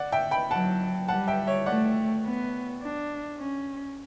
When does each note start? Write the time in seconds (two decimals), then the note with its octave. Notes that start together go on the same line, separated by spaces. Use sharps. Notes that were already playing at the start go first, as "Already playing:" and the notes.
Already playing: D5 F#5
0.12 E5 G5
0.31 G5 B5
0.51 F#3 F#5 A5
1.08 G3 F#5 A5
1.28 E5 G5
1.47 C#5 E5
1.66 A3 D5 F#5
2.25 B3
2.82 D4
3.39 C#4